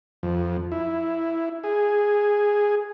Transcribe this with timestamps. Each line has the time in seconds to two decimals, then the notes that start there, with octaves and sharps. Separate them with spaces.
0.23 F2
0.72 E4
1.64 G#4